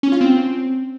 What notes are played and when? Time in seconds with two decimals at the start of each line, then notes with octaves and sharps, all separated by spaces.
0.03 C#4
0.12 F4
0.21 C4